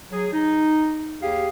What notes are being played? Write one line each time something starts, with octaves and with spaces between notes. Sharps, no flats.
F#3 G#4
D#4
D#2 G4 G#4 F5